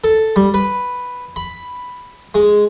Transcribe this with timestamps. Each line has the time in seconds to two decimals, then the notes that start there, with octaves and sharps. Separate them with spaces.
0.04 A4
0.36 G3
0.54 B4
1.36 B5
2.34 G#3